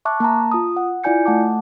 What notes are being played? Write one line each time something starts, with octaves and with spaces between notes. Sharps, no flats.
E5 A5 C#6 D6 F#6
A#3 A5 A#5
F4 D#6
F#5
E4 F4 D5 G#5 G6 C#7
A3 F#5 A5 D6